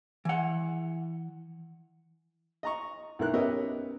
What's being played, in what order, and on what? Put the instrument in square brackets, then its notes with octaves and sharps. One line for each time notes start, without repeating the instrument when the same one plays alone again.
[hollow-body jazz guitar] E3 F#5
[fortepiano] D#5 A#5 C#6
B1 E4 A#4 F#6
B3 C#4 G4 A#4 D#5 E5